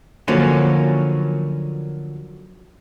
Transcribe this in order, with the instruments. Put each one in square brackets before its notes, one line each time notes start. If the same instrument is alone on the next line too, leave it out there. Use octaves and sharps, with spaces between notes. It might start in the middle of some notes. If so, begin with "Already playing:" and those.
[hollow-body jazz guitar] D3 F3 F#3 A#3 C#4